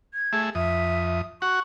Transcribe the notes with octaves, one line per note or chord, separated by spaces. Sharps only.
G#6
A3 G#4 E5
F2 E5 D#6
F#4 F#5 C#6